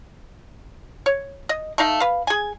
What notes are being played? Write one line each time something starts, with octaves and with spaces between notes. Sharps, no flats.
C#5
D#5
A3 D#4 F5
B4 F5
G#4 G#5